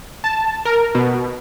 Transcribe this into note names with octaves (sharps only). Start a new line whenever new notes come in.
A5
A#4
B2